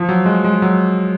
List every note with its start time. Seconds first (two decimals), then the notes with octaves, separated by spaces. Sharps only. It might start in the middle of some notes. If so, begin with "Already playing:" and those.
Already playing: F3
0.09 F#3
0.26 G#3
0.44 G#3
0.62 F#3